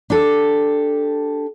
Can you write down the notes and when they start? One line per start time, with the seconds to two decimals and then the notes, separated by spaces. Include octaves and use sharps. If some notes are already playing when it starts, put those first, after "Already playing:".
0.10 D4 G4 A4